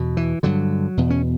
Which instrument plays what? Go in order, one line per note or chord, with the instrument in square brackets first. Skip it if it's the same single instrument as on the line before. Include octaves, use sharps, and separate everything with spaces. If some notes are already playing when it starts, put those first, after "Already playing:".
Already playing: [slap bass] E2 B2
E3
G2 D3 F#3
E2 B2
C#4